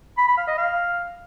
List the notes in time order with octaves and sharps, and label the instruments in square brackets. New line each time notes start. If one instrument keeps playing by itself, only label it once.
[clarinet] B5
B5
F5
D#5
F5